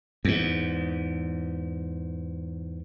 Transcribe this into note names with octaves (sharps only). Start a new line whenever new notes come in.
E2 G#2